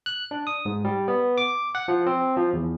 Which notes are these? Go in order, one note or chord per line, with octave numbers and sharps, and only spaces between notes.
F#6
D4
D#6
G#2
G3
B3
D6
F#5
F3
C4
F3
E2